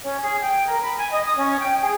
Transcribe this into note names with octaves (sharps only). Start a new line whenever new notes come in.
C#4
G#4
G5
A#4
B5
G#5
D#5
D#6
C#4
G5
G#4